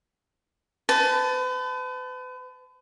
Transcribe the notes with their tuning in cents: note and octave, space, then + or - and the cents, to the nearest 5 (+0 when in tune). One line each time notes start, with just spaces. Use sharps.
B4 +40 A5 -10